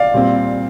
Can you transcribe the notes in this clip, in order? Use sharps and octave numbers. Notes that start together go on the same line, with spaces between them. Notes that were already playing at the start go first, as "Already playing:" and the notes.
Already playing: D5 F5
A#2 G3 C4